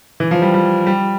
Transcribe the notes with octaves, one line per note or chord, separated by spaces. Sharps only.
E3
F3
G3
G3
G3